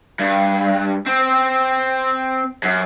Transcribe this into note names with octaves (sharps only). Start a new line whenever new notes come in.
G2
C4
F#2